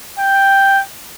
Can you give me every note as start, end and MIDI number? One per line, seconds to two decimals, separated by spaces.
0.19 0.81 79